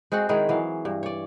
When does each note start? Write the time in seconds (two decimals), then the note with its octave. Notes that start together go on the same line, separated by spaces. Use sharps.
0.12 G#3 C4 F#4 F#5
0.29 D#3 G#3 E4 G#4
0.49 E3 F#3 F5
0.85 G2
1.03 C#5 D5